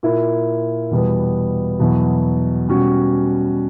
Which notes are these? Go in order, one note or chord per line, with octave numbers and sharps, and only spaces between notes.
A#2 A#3 E4
E2 B2 G3 B3
E2 B2 F#3
B2 G3 C#4 F#4